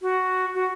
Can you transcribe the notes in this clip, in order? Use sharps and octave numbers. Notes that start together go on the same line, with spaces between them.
F#4
F#4